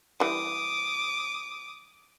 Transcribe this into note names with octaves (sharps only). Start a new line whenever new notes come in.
E3 G3 D6 D#6